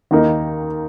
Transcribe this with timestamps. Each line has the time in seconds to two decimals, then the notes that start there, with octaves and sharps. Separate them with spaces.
0.11 D#2 D#3 A#3 D#4 A#4